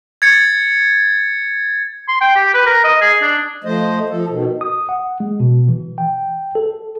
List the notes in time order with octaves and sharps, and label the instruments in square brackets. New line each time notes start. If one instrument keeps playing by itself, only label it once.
[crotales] G#6 A6 C#7
[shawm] C6
G5
G4
B4
A#4
D#5
G#4
D4
[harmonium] F3 A3 C5 D#5
F3 A4
B2 D#3
[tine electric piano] D#6
F#5
G#3
B2
E3
G5
A4